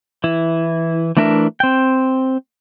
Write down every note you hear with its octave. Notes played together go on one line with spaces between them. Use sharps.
E3 E4
E3 A3 D4 A#4 E5
C4 G5